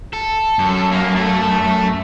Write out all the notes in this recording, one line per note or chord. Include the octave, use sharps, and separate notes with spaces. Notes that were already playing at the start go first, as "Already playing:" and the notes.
A4
F#2
A#3
A3 A4